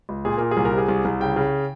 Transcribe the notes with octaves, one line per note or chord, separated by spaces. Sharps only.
C#2
A#2 G#4
A#2 A#4
G#4
C2
A#4
C3
G#4
C2
C2
C#3 G5
C#3